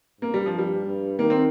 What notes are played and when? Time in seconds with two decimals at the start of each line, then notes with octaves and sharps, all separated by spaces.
0.21 G2 A#3
0.34 G3
0.46 F3
0.58 G3
0.86 G2
1.19 D#3 A#3
1.30 C4